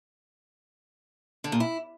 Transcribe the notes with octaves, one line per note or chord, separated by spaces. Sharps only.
D3
A#2
E4